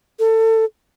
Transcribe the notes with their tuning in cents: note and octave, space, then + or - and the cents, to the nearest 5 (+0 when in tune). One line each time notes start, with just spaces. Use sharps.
A4 +25